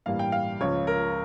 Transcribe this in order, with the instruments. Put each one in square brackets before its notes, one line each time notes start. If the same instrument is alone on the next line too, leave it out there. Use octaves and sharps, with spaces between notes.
[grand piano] A1 G2 E3 G3 A#3 F5
G5
F5
C#2 C#3 F3 C#4 C#5
A#4